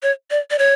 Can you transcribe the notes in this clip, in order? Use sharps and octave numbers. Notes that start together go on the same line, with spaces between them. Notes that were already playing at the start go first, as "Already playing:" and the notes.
C#5
D5
D5
C#5